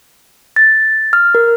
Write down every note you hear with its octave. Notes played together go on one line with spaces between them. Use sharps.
A6
F6
A#4